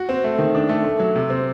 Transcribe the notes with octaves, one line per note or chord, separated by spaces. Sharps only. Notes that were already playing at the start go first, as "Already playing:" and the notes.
Already playing: F#4
C4
A3
D#3
D4
A3
A3
F#3
C3
C4